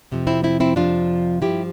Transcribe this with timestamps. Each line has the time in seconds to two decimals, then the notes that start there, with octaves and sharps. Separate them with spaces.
0.11 F2 C3 F3
0.27 C4 E4
0.44 C4 E4
0.60 C4 E4
0.76 F2 C3 F3 D4 F4
1.42 G2 F3 E4 G4